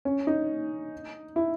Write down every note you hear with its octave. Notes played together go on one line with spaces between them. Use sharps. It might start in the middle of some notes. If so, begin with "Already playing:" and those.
C#4
D#4
E4